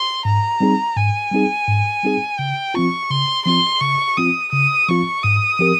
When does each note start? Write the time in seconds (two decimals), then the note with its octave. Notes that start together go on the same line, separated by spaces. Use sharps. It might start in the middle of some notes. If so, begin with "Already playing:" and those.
Already playing: C6
0.25 G#2 A#5
0.60 G3 C4 D#4 G#4
0.96 G#2 G#5
1.32 G3 C4 D#4 G#4
1.68 G#2
2.03 G3 C4 D#4 G#4
2.39 C#3 G5
2.74 F3 C4 F4 C#6
3.10 C#3 C6
3.45 F3 C4 F4 C6
3.81 C#3 C#6
4.17 F3 C4 F4 D#6
4.52 C#3 D#6
4.88 F3 C4 F4 C#6
5.23 G#2 D#6
5.59 F3 C4 G4 A#4